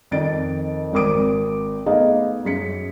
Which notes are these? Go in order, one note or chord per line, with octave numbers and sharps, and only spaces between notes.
F2 D#3 D5 A6 D7
G#1 C4 A#4 D6 D#6 D7
A3 B3 D#4 G#4 D#5 F5
F#2 G#4 B6 C#7